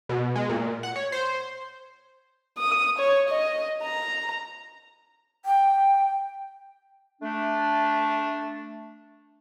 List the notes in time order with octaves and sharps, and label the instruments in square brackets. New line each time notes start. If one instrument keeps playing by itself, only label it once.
[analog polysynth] B2
G#3
A#2
F#5
C#5
C5
[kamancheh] D#6
C#5
D#5
A#5
[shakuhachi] G5
[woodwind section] A3 D4